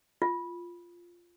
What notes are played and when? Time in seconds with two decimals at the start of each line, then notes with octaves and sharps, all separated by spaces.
0.22 F4